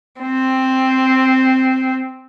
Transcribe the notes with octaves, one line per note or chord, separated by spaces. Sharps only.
C4